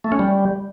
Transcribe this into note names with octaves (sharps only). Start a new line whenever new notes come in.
A3
C#4
G3